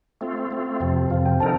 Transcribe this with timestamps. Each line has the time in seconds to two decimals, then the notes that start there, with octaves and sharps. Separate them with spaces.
0.21 A3 C4 F4
0.51 A3 C4 F4
0.80 F2 C3 F3 G5
0.96 G5
1.10 F2 C3 F3 F5
1.25 G5
1.40 D3 F3 C4 D#4 A#4 A5